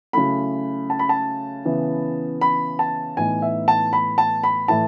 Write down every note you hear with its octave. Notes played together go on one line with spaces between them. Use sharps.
C#3 F#3 A3 E4 B5
A5
B5
A5
C#3 E3 B3 E4
B5
A5
A2 E3 B3 D#4 G#5
E5
A5
B5
A5
B5
A2 E3 A3 E4 A5